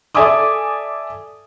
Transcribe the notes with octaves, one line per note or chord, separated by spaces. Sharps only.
A4 D5 E5 G#5 D6 D#6